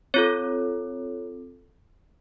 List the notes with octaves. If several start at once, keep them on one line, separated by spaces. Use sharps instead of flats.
C4 F4 A4 C#5